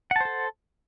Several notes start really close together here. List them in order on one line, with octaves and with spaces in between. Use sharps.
F#5 A5 C5 A4